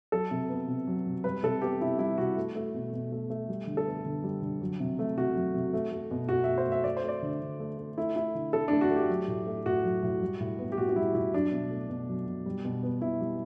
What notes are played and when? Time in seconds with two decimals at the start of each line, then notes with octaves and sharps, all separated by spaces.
0.12 F#3 A4
0.31 C3
0.49 B3
0.68 C3
0.87 F#3
1.07 C3
1.24 G3 B4
1.43 C3 A4
1.61 B3 G4
1.81 C3 E4
1.99 G3 E4
2.18 C3 F#4
2.37 A3
2.55 A3
2.74 B2
2.93 B2
3.12 A3
3.30 A3
3.49 G3
3.67 D3
3.77 A4
3.87 B3
4.05 D3
4.24 G3
4.42 D3
4.62 F#3
4.80 C3
4.99 A3
5.17 C3 F#4
5.36 F#3
5.54 C3
5.73 A3
5.92 A3
6.11 B2
6.29 B2 F#4
6.44 A3 E5
6.58 C5
6.66 A3
6.72 E5
6.84 A3 D5
6.97 C5
7.03 A3
7.08 D5
7.22 D3
7.42 D3
7.60 A3
7.78 A3
7.98 A3 E4
8.16 A3 E4
8.35 D3
8.53 D3 A4
8.68 A3 D4
8.81 F#4
8.90 A3
8.96 G4
9.09 F#3
9.28 A2
9.47 A3
9.66 A2 F#4
9.84 F#3
10.03 A2
10.22 G3
10.40 A2
10.59 B3
10.72 G4
10.78 A2 F#4
10.89 F#4
10.96 G3 E4
11.14 A2 E4
11.34 F#3 D4
11.52 B2
11.71 A3
11.90 B2
12.08 F#3
12.27 B2
12.46 G3
12.65 B2
12.83 B3
13.01 B2 E4
13.20 G3